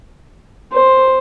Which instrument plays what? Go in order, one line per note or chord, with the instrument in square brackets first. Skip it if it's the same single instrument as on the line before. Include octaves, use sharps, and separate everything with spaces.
[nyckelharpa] C5